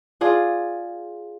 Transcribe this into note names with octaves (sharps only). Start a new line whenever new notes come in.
F4 G#4 D5